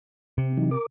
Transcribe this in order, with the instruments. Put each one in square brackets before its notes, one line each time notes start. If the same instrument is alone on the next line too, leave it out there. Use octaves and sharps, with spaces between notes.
[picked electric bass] C3 [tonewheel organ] C4
[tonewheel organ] E3 F#3 D#4
A#4 D6